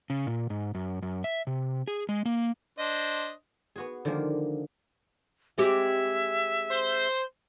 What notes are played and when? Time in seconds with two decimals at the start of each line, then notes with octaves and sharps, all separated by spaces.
0.10 C#3
0.27 A#2
0.50 G#2
0.75 F#2
1.02 F#2
1.24 E5
1.47 C3
1.88 G#4
2.09 G#3
2.25 A#3
2.79 D4 C5 D#5
3.76 B3 F#4 G#4
4.05 D3 D#3 F3 G#3 A#3
5.58 G#3 C4 G4 E5
6.70 C5